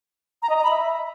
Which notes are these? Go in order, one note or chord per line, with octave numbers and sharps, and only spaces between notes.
A#5
D#5
A#5
B5
E5